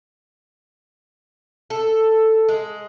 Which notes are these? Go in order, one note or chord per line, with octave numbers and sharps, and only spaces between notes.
A4
G#3